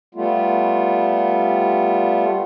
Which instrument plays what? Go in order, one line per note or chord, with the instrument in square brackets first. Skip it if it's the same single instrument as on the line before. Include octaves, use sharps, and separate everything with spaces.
[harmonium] G3 A3 B3 F4